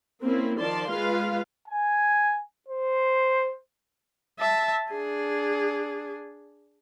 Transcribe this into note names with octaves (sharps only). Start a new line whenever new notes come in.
A#3 C4 C#4 E4
D#3 F3 D5 A5 C6
G#3 F4 B4 F5
G#5
C5
E5 A5
D4 G#4